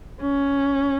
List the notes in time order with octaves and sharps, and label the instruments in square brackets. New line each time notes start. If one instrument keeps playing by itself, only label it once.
[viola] C#4